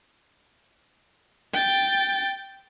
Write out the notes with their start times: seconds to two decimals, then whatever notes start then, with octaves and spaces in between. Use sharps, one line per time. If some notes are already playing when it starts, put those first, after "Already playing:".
1.54 G5 A6